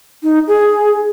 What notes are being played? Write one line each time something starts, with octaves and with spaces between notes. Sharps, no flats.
D#4
G#4